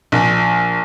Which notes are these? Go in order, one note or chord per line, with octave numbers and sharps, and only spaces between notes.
A#1